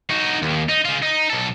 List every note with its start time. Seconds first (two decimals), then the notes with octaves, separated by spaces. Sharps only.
0.10 D#4 F#4
0.42 D#2
0.69 D#4
0.85 C#3 F4
1.02 D#4
1.30 B1 A4